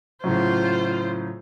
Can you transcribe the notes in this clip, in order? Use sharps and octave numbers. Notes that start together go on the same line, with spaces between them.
A2 C#3 F#3 F4 C5